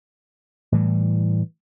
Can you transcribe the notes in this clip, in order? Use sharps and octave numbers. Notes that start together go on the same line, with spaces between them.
A2 E3 G3